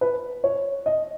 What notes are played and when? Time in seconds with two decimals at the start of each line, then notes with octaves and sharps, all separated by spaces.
0.01 B4
0.44 C#5
0.86 D#5